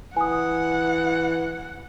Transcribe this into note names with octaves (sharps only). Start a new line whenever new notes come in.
E3 F#5 G#5 D#6